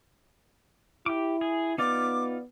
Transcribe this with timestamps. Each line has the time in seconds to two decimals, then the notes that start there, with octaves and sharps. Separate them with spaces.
1.06 E4 G4 D6
1.41 G#4
1.78 B3 D#4 F4 D5 D6